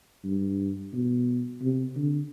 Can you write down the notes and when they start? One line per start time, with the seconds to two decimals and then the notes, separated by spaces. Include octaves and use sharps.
0.25 G2
0.93 B2
1.62 C3
1.97 D3